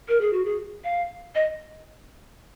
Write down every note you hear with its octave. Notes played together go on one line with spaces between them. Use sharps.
A#4
G#4
F#4
G#4
F5
D#5